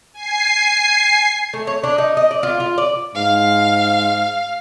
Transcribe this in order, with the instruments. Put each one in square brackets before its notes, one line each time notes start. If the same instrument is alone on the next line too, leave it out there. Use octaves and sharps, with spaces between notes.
[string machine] G#5 C7
[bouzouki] A3
C#5
D4
D#4
D#5
D5
F4
F4
D5
[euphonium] G#2 [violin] F5